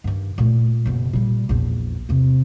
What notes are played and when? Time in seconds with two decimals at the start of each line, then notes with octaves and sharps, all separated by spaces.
0.04 G2 D#3
0.38 A#2 A3
0.86 F#1 B2
1.13 A#2 G3
1.49 A#1 E2
2.09 E2 C3